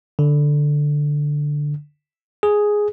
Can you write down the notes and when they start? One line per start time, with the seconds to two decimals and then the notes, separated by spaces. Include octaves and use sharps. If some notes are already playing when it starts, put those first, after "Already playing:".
0.19 D3
2.43 G#4